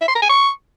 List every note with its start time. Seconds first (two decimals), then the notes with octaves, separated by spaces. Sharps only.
0.01 E5
0.08 C6
0.15 A#5
0.22 G#5
0.29 C#6